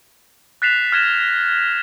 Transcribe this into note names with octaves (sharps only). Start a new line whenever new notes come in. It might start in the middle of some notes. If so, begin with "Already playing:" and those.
F#6 A6 B6 C7 E7 F7
F6 F#6 G#6 A#6 C7 E7